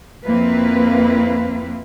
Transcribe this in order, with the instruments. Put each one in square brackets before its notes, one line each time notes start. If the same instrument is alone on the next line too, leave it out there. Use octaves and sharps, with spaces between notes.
[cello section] F2 A#3 C4 E4 B4 F5